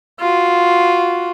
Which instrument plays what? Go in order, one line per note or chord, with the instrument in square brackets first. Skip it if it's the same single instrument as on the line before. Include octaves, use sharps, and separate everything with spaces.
[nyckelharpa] F4 F#4